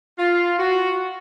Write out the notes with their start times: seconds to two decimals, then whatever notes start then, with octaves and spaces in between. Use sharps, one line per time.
0.19 F4
0.59 F#4